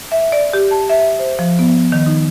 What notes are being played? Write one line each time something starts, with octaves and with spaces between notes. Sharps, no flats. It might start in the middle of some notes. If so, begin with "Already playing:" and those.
E5
D5
G4
A5
E5
C5
F3
B3
D#3
D#4